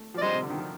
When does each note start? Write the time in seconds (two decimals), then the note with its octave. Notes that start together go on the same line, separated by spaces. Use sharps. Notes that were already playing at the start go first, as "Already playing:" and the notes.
Already playing: A3
0.14 F3
0.18 D5
0.21 G3 C5 D#5
0.35 C3
0.42 D3
0.50 D#3
0.58 F3